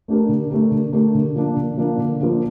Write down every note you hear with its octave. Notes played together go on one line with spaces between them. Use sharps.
A3 D4 G4 A#4
D3
A3 D4 G4 A#4
D3
A3 D4 G4 A#4
D3
F3 A#3 D4
D3
F3 A#3 D4
D3
F3 A#3 D4